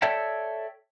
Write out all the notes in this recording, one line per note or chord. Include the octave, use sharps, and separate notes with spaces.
A4 C#5 D5 E5 G5 A5